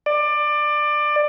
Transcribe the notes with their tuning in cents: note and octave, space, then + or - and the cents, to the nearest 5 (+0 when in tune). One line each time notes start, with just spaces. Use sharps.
D5 +20